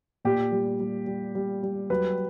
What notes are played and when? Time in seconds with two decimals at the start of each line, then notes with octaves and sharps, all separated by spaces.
0.25 A#2 G4
0.52 G3
0.80 G3
1.07 G3
1.35 G3
1.63 G3
1.90 F#3 B4